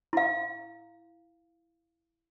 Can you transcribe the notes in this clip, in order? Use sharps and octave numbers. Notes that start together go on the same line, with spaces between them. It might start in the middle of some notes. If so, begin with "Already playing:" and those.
E4 F5